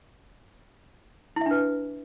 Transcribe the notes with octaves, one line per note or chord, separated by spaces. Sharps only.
D4 E4 B4 E5